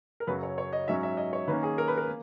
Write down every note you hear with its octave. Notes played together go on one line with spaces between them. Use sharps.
A#4
F#2 C#3 F#3 B4
C#5
C#5
D#5
G#2 F#3 C#4 E5
E5
D#5
C#5
D#3 A#3 C#4 B4
G#4
A#4
B4
A#4
A#3